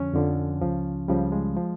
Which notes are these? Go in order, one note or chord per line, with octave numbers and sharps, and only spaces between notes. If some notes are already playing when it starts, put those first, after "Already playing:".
Already playing: F2 D3 F3 C#4
F2 D3 F3
C#2 C#3 F3
C#2 C#3 F3 G3
G#3
F3